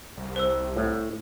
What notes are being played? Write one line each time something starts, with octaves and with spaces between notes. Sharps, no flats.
C2
C5 E6
A2